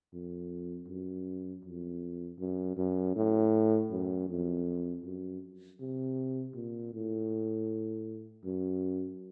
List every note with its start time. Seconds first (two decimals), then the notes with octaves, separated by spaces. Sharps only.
0.13 F2
0.88 F#2
1.65 F2
2.39 F#2
2.77 F#2
3.16 A2
3.91 F#2
4.29 F2
5.05 F#2
5.80 C3
6.55 A#2
6.94 A2
8.45 F#2